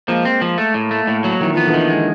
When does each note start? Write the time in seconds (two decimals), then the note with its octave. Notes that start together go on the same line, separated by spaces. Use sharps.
0.08 F3 G#3 A#3
0.25 C4
0.41 F3
0.58 A3
0.74 A2
0.91 A3
1.07 A2
1.24 F#3
1.40 D#3 E3
1.54 F3 B3
1.67 D3 E3
1.74 D#3
1.90 G#3